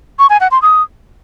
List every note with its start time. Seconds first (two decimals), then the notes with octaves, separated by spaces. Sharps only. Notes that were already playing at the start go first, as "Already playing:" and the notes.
0.19 C#6
0.30 G#5
0.41 F#5
0.51 C6
0.62 D#6